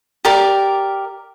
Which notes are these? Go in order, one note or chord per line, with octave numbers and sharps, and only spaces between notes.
G4 A#4 D5